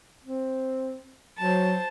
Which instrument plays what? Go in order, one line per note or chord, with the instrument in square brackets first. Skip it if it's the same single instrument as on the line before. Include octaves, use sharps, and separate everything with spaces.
[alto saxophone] C4
[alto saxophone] F#3 [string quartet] C5 A5